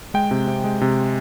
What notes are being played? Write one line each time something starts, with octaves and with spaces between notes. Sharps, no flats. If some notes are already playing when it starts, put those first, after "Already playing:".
G#3 G5
C3
C3
G#3
C3